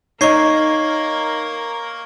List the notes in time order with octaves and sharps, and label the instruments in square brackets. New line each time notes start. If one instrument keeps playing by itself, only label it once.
[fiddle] A#3 A#4 [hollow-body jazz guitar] D#4 [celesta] C#5 D#5 [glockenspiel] C#6 G#6 C7